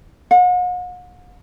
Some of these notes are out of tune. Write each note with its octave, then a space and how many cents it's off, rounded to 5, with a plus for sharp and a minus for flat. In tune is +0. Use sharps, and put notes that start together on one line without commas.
F#5 -45